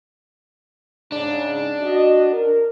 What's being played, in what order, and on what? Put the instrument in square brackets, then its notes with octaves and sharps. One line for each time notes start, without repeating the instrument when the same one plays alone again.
[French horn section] G#2 C#3 D#4 [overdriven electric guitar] D4
[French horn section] F#4 D#5
A#4